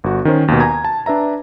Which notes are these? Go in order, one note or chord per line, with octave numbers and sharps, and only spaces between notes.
G1 F#4
D#3 C#4 C5
D#2 B2
G#5 A#5 G#6
A5
D4 B4 E5 A#5